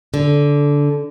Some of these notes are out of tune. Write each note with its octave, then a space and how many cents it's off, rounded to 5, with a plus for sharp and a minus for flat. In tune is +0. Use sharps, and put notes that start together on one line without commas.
D3 -15